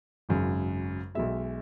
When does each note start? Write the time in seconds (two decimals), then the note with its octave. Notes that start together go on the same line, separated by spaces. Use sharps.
0.29 G#1 F#2 C#3
1.15 B1 B2 G#3 E5